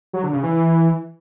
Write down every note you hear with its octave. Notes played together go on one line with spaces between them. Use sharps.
F#3
D3
C#3
E3